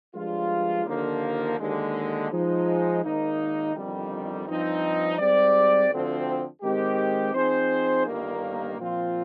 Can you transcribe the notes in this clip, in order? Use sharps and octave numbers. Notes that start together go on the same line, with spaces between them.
G2 F3 G#3 D4 F4
D#2 D3 F3 A#3
D#2 D3 G#3
F3 G#3 D#4
G#1 G#2 D#3 A#3 D#4
G1 F2 D#3 G3
G2 F3 C4 D#4
G#2 G3 C4 G4 D5
D2 D3 F3 C4
D#3 G#3 C4 D#4 G4
F3 C4 D#4 G#4 C5
G1 G2 D#3 A#3
A#2 F3 C4 F4